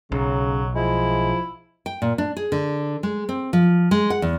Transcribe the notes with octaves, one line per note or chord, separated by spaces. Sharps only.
B1 C#3 F#3
F3 G#3 E4
G5
A#2
D4
G#4
D3
G#3
C4
F3
G#3
F#5
E2